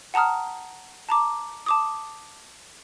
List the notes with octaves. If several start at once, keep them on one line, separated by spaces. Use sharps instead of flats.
F#5 A5 A#5 D#6 F6
A5 A#5 D6
A5 D6 D#6